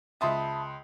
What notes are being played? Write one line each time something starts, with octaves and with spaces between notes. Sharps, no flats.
C#2 E5 A5 B5 C6 D#6